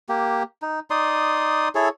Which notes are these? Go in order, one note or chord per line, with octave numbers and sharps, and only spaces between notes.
A#3 G4
D#4
D#4 D5 C6 D#6
E4 G#4 A4 C#5